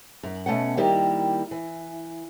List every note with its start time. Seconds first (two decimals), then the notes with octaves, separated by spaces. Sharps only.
0.23 F#2
0.46 B2 A3 C#4 F#5
0.77 D#3 G3 A#3 E4 G4
1.51 E3